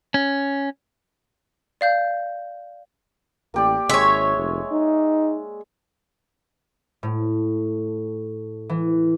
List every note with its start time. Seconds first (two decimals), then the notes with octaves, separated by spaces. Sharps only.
0.14 C#4
1.81 D5 F5 G6
3.54 A1 A#3 G4 D5
3.89 G#1 G#3 C#5 E5
4.36 F1
4.72 D#4
7.03 A2
8.69 E3